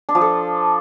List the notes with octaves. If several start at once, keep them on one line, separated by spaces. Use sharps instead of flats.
D4
F3
A4